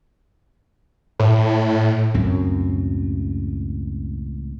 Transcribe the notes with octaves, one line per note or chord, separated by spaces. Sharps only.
A2
C#2 F#2 A2 C4